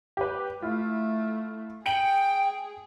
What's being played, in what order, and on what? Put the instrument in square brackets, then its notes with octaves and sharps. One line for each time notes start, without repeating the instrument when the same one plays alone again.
[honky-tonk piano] G4 B4
[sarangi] A3 [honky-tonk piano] E4 F4
[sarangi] G#4 [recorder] G5 [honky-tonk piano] C#7 D7 F#7